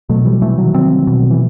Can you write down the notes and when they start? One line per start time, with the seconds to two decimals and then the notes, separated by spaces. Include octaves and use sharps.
0.10 B2 F#3 A3
0.25 E3 G3
0.42 C3 E3 A3
0.58 D#3 F#3
0.74 C4
1.07 B2
1.31 E3